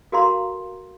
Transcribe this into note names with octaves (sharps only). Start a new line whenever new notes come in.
F#4 A4 A#4 F5 A#5 C6